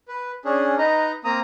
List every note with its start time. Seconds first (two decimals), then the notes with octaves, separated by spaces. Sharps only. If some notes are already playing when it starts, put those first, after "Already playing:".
0.08 B4
0.45 C#4 D4 G#4
0.78 D#4 B4 D#5 A#5
1.24 A#3 C4 A#5 D#6